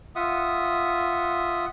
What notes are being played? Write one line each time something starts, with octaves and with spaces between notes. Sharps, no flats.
F4 E5 F#5 D#6